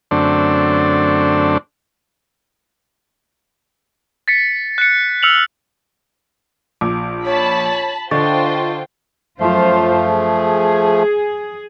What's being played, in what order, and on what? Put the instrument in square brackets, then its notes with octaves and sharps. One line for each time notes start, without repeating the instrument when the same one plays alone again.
[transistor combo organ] F#2 D3 A3 C4 D4
[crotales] A6 B6 C#7
F#6 C#7
E6 F6 C#7 F7 F#7
[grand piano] A#1 [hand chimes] D6
[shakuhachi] C#5 [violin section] A5 B5 B6
[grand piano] D3 [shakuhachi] D4 [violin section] F4 C5 G5 [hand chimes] D#5 C#6 A6
[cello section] F#2 F4 C5 [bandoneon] F3 A3
[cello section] G#4